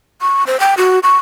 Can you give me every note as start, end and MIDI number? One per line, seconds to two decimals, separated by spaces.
0.21 0.44 85
0.47 0.60 72
0.60 0.74 79
0.78 0.99 66
1.03 1.19 85